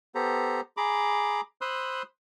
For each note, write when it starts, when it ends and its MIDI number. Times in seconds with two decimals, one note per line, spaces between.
0.15 0.61 59
0.15 0.61 67
0.15 0.61 69
0.15 0.61 72
0.15 0.61 82
0.77 1.41 68
0.77 1.41 82
0.77 1.41 83
0.77 1.41 86
1.61 2.02 72
1.61 2.02 83
1.61 2.02 84
1.61 2.02 87
1.61 2.02 88
1.61 2.02 90